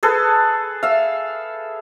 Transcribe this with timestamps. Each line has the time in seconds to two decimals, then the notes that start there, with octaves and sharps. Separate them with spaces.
0.03 G#4 A4 B4
0.83 E5 F5